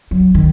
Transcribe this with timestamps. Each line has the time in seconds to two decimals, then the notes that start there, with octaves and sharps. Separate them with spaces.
0.11 F#3
0.35 D#3